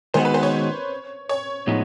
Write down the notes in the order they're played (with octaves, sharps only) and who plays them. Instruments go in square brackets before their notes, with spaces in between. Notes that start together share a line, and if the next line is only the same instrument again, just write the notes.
[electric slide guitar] D#3 G#3 B3 D#4 F#4 [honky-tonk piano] C5
[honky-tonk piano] B4
C5
C#5
C#5
[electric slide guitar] A2 F3 G#3 B3 D#4